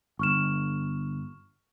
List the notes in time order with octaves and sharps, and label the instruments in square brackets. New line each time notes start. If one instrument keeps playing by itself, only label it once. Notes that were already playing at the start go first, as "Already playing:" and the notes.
[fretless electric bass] G1 [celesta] C#6 F6 E7